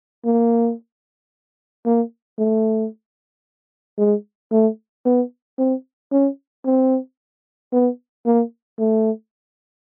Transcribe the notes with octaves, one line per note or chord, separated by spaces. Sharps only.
A#3
A#3
A3
G#3
A3
B3
C4
C#4
C4
B3
A#3
A3